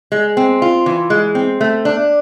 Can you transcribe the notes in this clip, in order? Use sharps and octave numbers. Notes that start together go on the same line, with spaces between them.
G#3
C4
F4
E3
G#3
C4
A3
D4